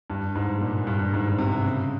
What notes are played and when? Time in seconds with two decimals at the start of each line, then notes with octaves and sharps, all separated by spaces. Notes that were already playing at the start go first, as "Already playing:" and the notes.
0.10 G2
0.35 G#2
0.61 A#2
0.87 G2
1.14 G#2
1.39 C3
1.65 C#3